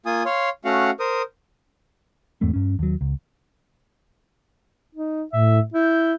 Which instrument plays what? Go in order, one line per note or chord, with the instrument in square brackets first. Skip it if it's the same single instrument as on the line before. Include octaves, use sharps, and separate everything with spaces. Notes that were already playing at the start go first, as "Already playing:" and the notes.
[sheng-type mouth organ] A#3 F4 G#5 D#6
C#5 F5 C6
A3 C#4 F#4 F5 F#5
A#4 C5 D#6
[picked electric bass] E2 G#2 A3 C4
G2 C#4
D#2 F#3
C#2
[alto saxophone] D#4
[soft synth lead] A2 [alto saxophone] E5
[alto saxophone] E4 [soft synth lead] G6